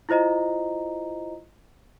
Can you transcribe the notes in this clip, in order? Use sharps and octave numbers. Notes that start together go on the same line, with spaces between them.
E4 F4 C5 D#5 A#5